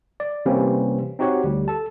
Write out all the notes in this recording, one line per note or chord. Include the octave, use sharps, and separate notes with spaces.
D5
C3 E3 G3 A#3 C4 C#4
C4 D#4 F#4 G4 C#5 F#5
D2 G3
A4 A5